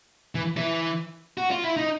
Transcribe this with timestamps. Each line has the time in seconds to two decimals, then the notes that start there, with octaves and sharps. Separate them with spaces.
0.35 E3
0.57 E3
1.38 F#4
1.51 F4
1.64 E4
1.77 D#4